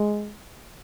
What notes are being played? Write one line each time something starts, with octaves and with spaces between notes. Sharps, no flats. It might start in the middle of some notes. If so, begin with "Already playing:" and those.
Already playing: G#3